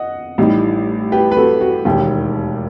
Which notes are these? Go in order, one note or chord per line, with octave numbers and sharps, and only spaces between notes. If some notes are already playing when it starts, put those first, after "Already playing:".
Already playing: D#5 F#5
A1 A2 G3 D#4
G4 B4
B4
F#4 A4
F#4
E1 D#2 D#3 G4